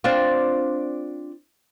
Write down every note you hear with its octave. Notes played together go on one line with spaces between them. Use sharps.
C4 D4 F4